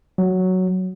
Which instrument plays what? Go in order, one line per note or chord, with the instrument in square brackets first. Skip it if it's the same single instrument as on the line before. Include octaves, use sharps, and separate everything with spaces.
[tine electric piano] F#3